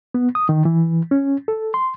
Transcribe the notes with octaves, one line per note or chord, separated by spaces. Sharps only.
B3
D#6
D#3
E3
C#4
A4
C6